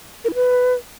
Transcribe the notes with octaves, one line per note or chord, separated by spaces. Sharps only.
A#4
E4
B4